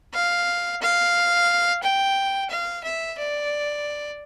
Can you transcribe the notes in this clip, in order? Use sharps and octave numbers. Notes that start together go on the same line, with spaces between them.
F5
F5
G5
F5
E5
D5